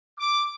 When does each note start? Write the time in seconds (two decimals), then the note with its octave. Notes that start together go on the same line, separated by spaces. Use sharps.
0.20 D6